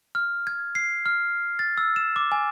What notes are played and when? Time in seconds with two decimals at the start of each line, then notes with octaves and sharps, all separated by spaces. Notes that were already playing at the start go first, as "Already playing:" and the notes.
0.15 F6
0.47 G#6
0.75 C7
1.06 F6
1.59 A6
1.78 E6
1.96 E7
2.16 D6
2.32 G#5